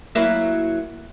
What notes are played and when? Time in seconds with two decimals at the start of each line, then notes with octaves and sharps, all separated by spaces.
0.15 F#3 A#3 E4